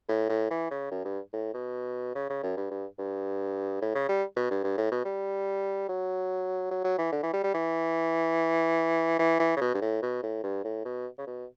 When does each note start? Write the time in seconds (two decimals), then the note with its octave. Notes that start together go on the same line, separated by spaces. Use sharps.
0.09 A2
0.29 A2
0.50 E3
0.71 C#3
0.91 F#2
1.05 G2
1.33 A2
1.54 B2
2.15 C#3
2.30 C#3
2.43 F#2
2.57 G2
2.71 G2
2.99 G2
3.82 A2
3.95 C#3
4.09 G3
4.36 B2
4.51 G2
4.64 G2
4.78 A2
4.92 B2
5.05 G3
5.88 F#3
6.71 F#3
6.84 F#3
6.98 E3
7.12 D3
7.23 E3
7.33 G3
7.44 G3
7.54 E3
9.19 E3
9.39 E3
9.56 C#3
9.61 B2
9.74 G2
9.82 A2
10.02 B2
10.23 A2
10.44 G2
10.64 A2
10.85 B2
11.18 C#3
11.27 B2